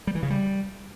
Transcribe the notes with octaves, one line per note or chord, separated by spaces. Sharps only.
G3
E3
C#3
G3